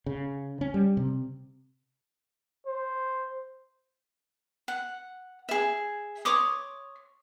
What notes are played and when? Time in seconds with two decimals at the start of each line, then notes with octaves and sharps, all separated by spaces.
0.06 C#3
0.61 C#4
0.74 G3
0.97 C3
2.66 C5
4.68 F#5
5.49 G#4 E5
6.25 C#5 C6 D6 D#6